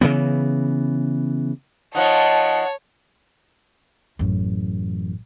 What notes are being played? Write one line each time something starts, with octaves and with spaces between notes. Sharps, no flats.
C#3 E3 B3
F3 D#4 C#5 F#5 A5
A1 F#2